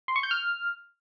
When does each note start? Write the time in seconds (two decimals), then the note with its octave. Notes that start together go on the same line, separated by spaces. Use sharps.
0.08 C6
0.16 C#6
0.23 G6
0.31 F6